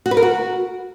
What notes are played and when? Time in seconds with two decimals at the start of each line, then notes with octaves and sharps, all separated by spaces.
0.06 F#4
0.11 B4
0.17 A#4
0.23 F#4